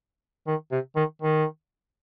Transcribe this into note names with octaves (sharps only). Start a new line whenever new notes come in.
D#3
C3
D#3
D#3